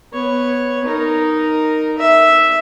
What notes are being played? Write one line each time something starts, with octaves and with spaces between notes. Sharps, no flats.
B3 C#5
D#4 A#4
E5